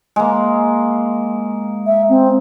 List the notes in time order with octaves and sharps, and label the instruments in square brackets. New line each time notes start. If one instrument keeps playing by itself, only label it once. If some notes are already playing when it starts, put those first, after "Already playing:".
[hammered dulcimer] G#3 A#3
[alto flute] E5
C4